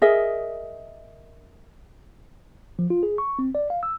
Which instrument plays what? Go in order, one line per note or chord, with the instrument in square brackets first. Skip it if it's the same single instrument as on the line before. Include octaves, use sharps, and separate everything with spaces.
[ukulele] G#4 A#4 D#5 E5
[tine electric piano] F3
F4
G#4
C#6
C4
D5
F5
E6